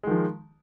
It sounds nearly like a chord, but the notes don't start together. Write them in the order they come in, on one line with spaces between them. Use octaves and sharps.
G#3 D#3 F3